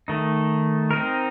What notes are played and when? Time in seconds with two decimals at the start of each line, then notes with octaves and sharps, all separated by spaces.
0.08 D#3 A3 D#4
0.91 C4 D#4 A#4